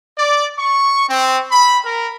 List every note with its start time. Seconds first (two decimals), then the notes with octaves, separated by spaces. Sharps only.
0.18 D5
0.58 C#6
1.08 C4
1.51 B5
1.84 A#4